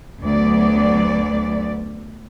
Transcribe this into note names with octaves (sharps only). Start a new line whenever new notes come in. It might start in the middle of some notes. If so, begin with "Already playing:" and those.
D2 F#3 B3 D5